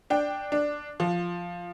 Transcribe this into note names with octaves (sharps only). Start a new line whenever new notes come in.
D4 G5
D4
F3